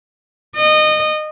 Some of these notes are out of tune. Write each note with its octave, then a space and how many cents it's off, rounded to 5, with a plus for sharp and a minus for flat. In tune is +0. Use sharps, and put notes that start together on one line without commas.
D#5 -25